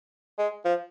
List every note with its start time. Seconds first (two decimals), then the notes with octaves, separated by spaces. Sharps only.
0.38 G#3
0.65 F3